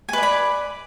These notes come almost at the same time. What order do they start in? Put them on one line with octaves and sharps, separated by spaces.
G#5 B4 D5 B5